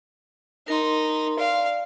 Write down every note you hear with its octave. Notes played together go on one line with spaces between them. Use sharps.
D#4 A#4 C6
D5 F5